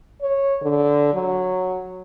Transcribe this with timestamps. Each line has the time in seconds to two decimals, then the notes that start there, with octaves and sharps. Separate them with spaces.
0.22 C#5
0.61 D3
1.14 F#3